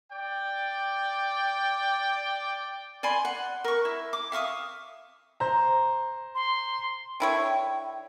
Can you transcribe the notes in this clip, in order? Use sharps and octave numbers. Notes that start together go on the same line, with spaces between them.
D5 G5
D5 G#5 B5 C6
F#5
A#4 C#6
E4
D6
E5 F5 C#6 D#6
C5 A#5
C6
D3 E4 C#5 G5